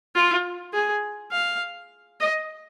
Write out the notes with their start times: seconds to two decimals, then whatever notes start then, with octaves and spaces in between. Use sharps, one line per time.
0.15 F4
0.74 G#4
1.32 F5
2.20 D#5